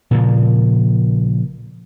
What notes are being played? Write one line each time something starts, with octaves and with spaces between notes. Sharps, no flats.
A#2 C#3 F3